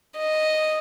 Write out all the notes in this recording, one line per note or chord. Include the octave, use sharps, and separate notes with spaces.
D#5